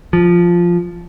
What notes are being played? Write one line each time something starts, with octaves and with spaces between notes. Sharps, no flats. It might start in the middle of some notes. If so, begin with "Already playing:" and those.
F3